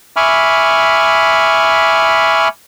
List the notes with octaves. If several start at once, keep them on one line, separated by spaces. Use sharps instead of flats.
E5 G#5 B5 C#6 D6 F6